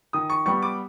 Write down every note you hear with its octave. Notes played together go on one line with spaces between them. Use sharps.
D#3 D#6
C#6
G3 B3 C#6
D6